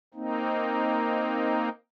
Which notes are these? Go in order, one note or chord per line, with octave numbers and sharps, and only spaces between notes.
A#3 C4 D#4